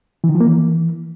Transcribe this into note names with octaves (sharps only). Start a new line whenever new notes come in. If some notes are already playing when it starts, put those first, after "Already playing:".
E3
D#3
F3
A#3
E3